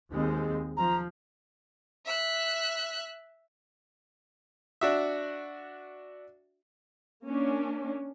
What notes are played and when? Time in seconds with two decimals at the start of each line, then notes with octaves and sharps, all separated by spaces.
0.10 D#2 G#3 C4
0.77 F3 A#5
2.06 E5 F#6
4.81 D4 F#4 E5
7.24 A#3 C#4 D4